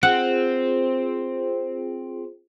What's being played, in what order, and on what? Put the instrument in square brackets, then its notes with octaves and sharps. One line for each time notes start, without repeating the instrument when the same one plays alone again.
[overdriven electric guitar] C4 [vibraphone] F4 G#4 C5 [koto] F#5